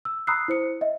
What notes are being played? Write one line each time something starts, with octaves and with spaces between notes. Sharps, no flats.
E6
A#5 B5 D#6 E6 F#6 C7
E4 C5 C#7
D#5 E5